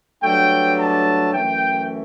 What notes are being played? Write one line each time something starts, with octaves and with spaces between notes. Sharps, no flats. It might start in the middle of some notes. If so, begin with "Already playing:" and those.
G2 F#3 A3 D4 G5
A5
F#2 E3 A3 G5